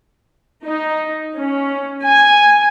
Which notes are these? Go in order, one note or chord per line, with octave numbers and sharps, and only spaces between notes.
D#4
C#4
G#5